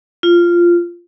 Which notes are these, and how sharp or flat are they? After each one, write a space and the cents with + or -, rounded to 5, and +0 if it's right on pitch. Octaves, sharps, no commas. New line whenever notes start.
F4 -10